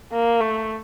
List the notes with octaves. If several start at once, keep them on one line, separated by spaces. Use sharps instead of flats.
A#3
A3